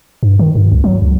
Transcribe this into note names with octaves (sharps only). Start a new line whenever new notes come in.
G2
D#3
G2
C#2
F#3
C#2